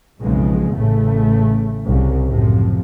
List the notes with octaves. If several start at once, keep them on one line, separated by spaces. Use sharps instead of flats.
B1 F2 C#3 G#3
A1 A2 C#3 A3
C2 C#3
F#2 A2 C3 F3